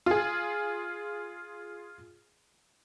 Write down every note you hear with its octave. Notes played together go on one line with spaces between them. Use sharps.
F4 G#4